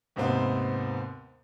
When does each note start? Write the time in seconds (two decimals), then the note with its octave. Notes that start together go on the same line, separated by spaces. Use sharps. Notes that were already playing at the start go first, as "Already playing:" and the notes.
0.16 D#2 G#2 C3 B3 C4